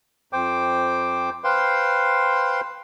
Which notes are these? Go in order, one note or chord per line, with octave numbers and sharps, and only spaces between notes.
F2 C5 G5 D6
B4 C5 F5 G5 C6